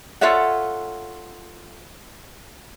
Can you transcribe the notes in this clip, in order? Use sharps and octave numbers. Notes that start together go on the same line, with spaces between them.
F4 A4 C#5 E5 F#5